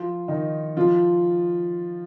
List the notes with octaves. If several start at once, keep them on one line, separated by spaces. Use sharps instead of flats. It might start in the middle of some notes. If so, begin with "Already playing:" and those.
Already playing: F3 F4
D#3 D#4
F3 F4